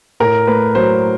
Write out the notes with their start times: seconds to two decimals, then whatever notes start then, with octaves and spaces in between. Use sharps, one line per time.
0.20 A2 A#4
0.47 A3 B4
0.75 F#3 C5